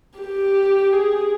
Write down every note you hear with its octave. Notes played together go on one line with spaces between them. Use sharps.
G4
G#4